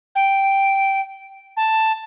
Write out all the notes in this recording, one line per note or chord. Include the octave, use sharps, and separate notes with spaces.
G5
A5